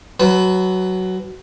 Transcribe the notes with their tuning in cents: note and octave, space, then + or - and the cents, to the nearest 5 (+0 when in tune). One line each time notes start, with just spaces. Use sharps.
F#3 +10 B4 +15 A5 -35